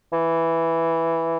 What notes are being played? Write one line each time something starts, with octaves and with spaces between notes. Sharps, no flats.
E3